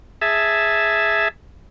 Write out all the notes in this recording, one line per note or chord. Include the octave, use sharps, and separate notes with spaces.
G#4 E5 A5